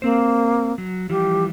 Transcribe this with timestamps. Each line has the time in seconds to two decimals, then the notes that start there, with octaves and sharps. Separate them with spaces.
0.02 A#3 C4 C5
0.78 F#3
1.10 E3 F3 G3 G4